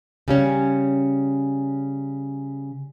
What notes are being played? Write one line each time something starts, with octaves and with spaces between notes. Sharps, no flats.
C#3 G3 C#4